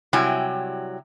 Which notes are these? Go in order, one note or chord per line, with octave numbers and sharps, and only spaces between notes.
C3 F#3 G3 E4 G5 G#5